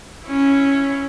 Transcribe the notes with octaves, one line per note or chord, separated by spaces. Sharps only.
C#4 E4